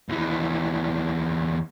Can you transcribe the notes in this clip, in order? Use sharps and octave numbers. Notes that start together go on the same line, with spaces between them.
D#2 E3